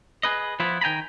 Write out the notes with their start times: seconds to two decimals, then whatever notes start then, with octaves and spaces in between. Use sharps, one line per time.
0.23 G#4 B4 D#5
0.60 F3 B3 E4 F4
0.81 D#3 G5 G#5 A#5 B5